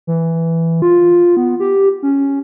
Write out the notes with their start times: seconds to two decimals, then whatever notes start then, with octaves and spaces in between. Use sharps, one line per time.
0.07 E3
0.82 F4
1.37 B3
1.60 G4
2.03 C#4